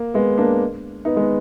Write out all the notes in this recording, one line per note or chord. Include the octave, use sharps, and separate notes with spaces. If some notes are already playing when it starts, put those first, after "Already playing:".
Already playing: A#3
G#3 B3
A#3 D4
B3 D#4
G#3 B3